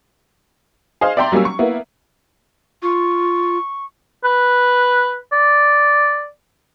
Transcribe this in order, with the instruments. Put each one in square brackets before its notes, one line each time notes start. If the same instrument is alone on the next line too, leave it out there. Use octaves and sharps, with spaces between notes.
[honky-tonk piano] G#4 C5 D#5 F5
D5 E5 G5 A#5 C6
F#3 G3 A#3 C#4 E6
C#6
A#3 B3 E4
[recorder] F4 [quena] C#6
[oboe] B4
D5